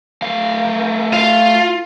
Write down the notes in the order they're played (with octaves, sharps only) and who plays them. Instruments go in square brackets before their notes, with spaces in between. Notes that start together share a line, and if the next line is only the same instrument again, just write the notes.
[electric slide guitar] A3 F5
[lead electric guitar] F4